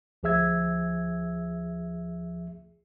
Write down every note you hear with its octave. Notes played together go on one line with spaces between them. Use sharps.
D2 F3 G#4 E5 E6 G#6